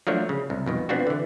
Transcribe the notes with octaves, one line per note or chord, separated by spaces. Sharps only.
F3 F#3 A3 A#3 D4 C#5
C#3
C2
F2 B2 D#3
B3 C4 D4 F4 F#4
D3 E3